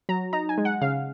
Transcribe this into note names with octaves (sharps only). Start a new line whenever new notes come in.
F#3 A#5
D#4 A#5
G#5
G#3
F#5
C#3 F5